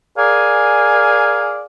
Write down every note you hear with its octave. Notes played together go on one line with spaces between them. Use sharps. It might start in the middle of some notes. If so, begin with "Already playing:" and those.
G#4 A#4 D5 F5 G#5